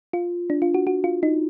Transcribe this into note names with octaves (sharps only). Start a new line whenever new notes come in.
F4
D4
F4
F#4
F#4
F4
D#4